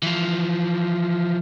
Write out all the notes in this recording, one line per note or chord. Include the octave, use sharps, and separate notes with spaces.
E3 F3